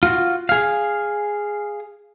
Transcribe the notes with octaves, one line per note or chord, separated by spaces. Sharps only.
F4 F#4
G#4 F5